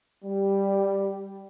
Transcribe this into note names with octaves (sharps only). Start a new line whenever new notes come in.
G3